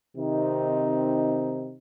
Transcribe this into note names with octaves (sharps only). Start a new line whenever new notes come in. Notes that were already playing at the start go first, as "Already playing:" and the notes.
C3 D#3 C4 D#4